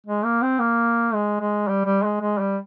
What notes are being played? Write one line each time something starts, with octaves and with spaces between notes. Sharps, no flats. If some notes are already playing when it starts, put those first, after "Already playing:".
G#3
A#3
C4
A#3
G#3
G#3
G3
G3
G#3
G#3
G3